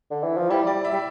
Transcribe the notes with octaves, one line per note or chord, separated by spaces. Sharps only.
D3
E3
F3
G3 E4
G3 D5
E5
G3